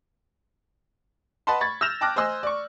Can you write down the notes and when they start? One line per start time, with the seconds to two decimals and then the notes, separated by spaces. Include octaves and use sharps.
1.47 B4 D#5 F#5 A5 B5 C6
1.61 B5 C#6 G#6 A6
1.81 E6 F6 G6 A#6 E7 F7
2.01 G5 A5 D6 F6 F#6 A#6
2.16 C5 D#5 G#5 C6 E6 F#6
2.43 D5 C#6